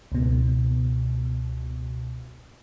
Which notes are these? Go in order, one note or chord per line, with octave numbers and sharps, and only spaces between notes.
C#2 B2